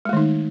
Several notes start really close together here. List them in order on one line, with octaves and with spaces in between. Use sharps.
G#3 A3 D#3 D#4